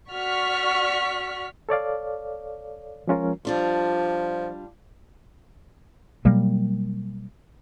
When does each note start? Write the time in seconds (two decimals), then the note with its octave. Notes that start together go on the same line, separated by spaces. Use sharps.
0.11 F#4 D5 C#6 F6 B6
1.69 A4 C#5 D5 F5
3.07 F3 G#3 C#4 F4 A#4
3.45 F3 G3 D4 F4
6.25 B2 F#3 G3 A#3